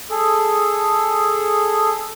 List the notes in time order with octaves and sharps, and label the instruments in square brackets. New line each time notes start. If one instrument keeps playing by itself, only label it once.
[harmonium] G#4 A4